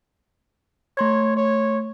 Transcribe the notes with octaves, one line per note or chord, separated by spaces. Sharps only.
A3 C#5 C6 G#6
C#5